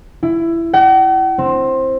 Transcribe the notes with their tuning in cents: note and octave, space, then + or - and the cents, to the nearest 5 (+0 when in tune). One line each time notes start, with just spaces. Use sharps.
E4 +15
F#5 +45
C4 +15